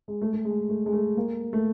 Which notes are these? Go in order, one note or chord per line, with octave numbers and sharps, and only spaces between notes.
G#3
A3
A3
G#3
A3
G#3
A3
A#3
A3